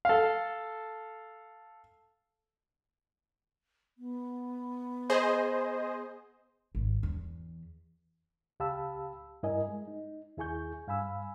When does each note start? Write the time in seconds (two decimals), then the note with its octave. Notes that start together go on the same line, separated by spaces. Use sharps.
0.05 A4 F5
3.98 B3
5.10 G#4 C5 D#5
6.75 G#1
7.03 E2
8.60 C#2 G4 F5 A5 B5 E6
9.43 G2 E4 A#4 D#5 G#5
9.68 G#3
9.88 D#4
10.37 D#2 E4 G#4 G#5 C#6 G6
10.87 G2 F5 G#5 B5 E6